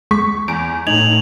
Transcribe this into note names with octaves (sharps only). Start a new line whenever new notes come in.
G#3 C#6 B6
E2 D7
A2 D#4 G#6 F7 F#7